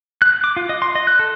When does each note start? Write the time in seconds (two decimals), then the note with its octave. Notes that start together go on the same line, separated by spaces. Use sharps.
0.22 F#6
0.44 D6
0.57 F4
0.69 D#5
0.82 C6
0.95 D#5
1.07 F#6
1.19 A4